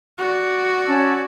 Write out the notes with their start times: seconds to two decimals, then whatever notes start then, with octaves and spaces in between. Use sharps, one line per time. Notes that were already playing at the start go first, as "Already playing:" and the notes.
0.18 F#4 D5
0.86 C#4 A5 E6